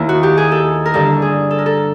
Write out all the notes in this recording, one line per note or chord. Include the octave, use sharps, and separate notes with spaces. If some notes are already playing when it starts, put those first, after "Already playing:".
Already playing: D#2 D#3 E4
F#4
G4
G#4
A4
A#4
G2 D3 A4
G#4
A4
A#4
A4